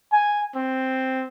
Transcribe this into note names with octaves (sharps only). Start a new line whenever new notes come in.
G#5
C4